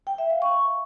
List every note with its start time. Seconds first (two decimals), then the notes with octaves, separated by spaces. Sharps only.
0.07 G5
0.18 E5
0.30 F5
0.42 C#6